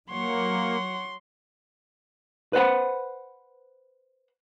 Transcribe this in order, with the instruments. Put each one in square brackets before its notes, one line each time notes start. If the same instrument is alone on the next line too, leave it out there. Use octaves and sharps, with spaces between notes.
[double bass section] F#3 [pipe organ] A#3 [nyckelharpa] C#5 F#5 [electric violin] C6
[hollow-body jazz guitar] B4 C5 F#5 B5